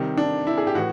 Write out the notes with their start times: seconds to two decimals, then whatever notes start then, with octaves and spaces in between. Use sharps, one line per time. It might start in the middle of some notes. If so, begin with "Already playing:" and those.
Already playing: C3 D#3 G3
0.17 D4
0.47 E4
0.57 G#4
0.67 G4
0.75 A2 E3 F#4